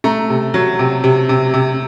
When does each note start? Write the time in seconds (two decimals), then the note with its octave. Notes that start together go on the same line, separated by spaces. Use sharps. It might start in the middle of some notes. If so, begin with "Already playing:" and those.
0.04 A3 A#5
0.30 C3
0.54 F#3
0.79 C3
1.04 C3
1.29 C3
1.54 C3